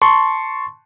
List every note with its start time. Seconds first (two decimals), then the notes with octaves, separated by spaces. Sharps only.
0.02 A5 C6 C#6